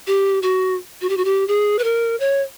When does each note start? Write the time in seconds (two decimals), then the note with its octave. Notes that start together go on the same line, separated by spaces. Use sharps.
0.07 G4
0.42 F#4
1.01 F#4
1.09 G4
1.17 F#4
1.25 G4
1.48 G#4
1.79 B4
1.84 A#4
2.20 C#5